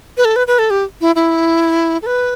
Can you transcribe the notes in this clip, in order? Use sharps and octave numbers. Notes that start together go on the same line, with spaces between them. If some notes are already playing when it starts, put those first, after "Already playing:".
B4
A4
B4
B4
A4
G4
E4
E4
A4
B4